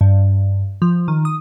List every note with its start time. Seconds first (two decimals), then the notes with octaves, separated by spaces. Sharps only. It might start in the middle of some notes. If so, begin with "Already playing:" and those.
0.01 G2
0.82 F3
1.08 D#3
1.25 D#6